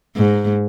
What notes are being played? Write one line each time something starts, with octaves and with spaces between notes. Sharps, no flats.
G#2